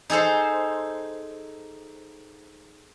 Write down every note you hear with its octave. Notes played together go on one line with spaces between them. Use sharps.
D#4 G#4 A4 C5